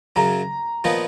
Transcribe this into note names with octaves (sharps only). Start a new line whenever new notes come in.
F#2 C#3 F#3 A#5
A#2 F3 B3 D#4